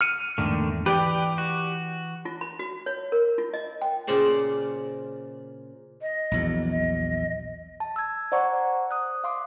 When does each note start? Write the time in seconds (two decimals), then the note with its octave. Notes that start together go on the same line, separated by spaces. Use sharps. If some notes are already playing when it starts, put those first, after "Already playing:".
0.01 F6 C#7 D#7
0.38 E2 G#2 D3 D#3 A3 A#3
0.86 E3 G4 B4 D5 G5
1.38 F#4
2.25 F4
2.41 B5
2.59 F#4
2.86 C#5
3.12 A#4
3.38 F4
3.54 D#5
3.82 G5
4.07 A#2 C#3 C5 D5
6.02 D#5
6.31 A#1 E2 F#3
6.70 D#5
7.80 A5
7.96 E6 G#6
8.32 C5 D5 F#5 A#5 C#6
8.91 D#6 F#6
9.24 F5 C6 D6